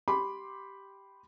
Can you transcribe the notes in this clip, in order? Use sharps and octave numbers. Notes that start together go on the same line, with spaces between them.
G4 B5 C6 D6